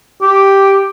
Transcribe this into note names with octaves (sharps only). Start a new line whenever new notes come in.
G4